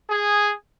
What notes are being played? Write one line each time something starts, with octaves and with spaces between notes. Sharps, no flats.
G#4